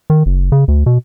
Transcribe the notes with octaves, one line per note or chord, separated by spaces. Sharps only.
D#3
F#1
C#3
D2
B2